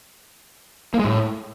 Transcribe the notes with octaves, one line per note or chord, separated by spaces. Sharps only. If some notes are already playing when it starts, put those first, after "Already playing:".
A#3
G#3
A2